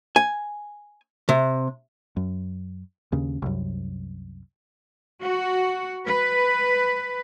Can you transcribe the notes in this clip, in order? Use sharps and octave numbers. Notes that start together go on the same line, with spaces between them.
G#5
C3
F#2
D#2 C#3
C2 F#2
F#4
B4